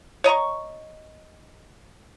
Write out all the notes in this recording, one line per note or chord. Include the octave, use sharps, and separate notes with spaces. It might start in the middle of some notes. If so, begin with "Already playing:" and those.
C#5 D#5 A#5 C#6